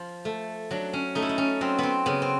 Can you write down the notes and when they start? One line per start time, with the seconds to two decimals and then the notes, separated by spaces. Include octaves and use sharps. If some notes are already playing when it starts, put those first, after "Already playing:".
Already playing: F3
0.25 A3
0.71 F#3 D4
0.93 C#4
1.15 A3 D#4
1.22 E4
1.29 D#4
1.38 C#4
1.61 F#3 C4
1.79 B3 C4
2.06 C#3 B3
2.22 C4